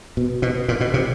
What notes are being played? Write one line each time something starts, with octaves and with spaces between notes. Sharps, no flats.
B2
B2
A#2
B2
C3